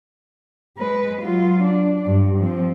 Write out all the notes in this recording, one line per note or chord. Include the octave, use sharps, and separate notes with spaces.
G#3 B4
F#3 F4
D4
G2
F3 C4